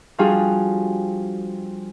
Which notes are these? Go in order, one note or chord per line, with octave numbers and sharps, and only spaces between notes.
F3 G3 D4 F4 F#4 G#4